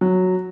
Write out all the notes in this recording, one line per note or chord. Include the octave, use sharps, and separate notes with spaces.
F#3